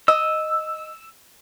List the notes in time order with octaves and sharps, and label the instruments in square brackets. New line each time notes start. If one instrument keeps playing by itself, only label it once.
[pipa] D#5 [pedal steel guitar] E6